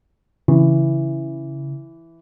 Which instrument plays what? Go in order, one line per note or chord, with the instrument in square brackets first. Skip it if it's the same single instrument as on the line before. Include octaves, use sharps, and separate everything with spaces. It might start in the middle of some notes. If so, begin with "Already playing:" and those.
[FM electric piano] C#3 [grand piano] E3